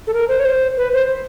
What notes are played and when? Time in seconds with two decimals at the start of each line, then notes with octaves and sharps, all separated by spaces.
0.07 A4
0.14 A#4
0.28 C5
0.40 C#5
0.45 C5
0.77 B4
0.93 C5